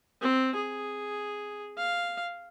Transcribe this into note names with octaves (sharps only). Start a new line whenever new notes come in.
C4
G#4
F5